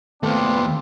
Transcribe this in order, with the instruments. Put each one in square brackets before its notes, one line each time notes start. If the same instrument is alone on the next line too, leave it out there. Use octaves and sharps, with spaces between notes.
[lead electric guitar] D#2 B3 [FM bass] A3 [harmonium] C4 [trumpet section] D4 F4